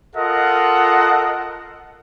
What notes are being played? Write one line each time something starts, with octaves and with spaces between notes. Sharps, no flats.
F4 A4 A#4 D#5 F#5